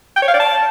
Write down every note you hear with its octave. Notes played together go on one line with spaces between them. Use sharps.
G5
C#5
F5
D5
A5